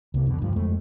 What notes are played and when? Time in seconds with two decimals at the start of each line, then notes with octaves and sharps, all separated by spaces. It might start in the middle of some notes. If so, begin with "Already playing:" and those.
0.14 C2 C3 A#3
0.26 F2 B2 D3
0.42 E1 D2 G2 F3
0.56 F2 G#3 A3